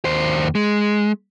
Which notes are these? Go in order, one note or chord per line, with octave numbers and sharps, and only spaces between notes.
D#2 C5
G#3